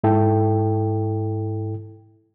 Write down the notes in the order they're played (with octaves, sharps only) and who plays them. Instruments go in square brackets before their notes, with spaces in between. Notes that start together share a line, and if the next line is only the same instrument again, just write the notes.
[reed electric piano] G#2 E4 A4 G5